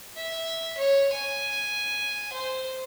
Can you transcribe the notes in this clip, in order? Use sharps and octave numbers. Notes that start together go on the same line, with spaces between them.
E5
C#5
G#5
C5